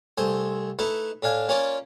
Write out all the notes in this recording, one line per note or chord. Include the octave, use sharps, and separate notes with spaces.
C2 A3 C5 G#5
A3 D#4 E4 B4
A2 D4 F5 G#5
A#3 C#4 F4 D5 G#5